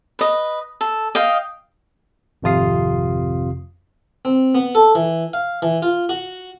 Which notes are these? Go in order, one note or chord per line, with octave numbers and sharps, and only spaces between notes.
B4 D#5
A4
D#5 F5 G5
G#1 F2 C3 F4 D#6 C7
C4
B3
A4
E3
F5
E3
F4
F#4